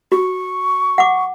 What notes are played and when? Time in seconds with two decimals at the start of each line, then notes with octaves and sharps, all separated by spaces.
0.12 F#4 C#6
0.98 F#5 D6